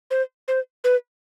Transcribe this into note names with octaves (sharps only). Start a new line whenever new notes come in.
C5
C5
B4